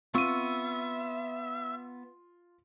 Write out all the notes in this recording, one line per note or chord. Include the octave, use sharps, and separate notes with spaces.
B3 C4 F4 E5 C#6 E6 D#7